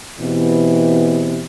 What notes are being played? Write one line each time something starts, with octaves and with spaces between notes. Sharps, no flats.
B2 E3 B3 C4 E4 G4